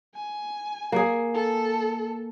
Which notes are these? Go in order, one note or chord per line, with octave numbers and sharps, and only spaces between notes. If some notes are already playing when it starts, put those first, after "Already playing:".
G#5
A#3 G#4
A4